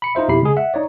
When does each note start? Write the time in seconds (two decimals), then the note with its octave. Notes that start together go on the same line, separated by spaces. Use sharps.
0.02 B5 C#7
0.15 D#4 F4 C5 E5
0.28 F2 B2 E4 G4 B5 C7
0.41 C#3 G#3 G#4
0.57 E5 F#5
0.74 D#4 C#5 D5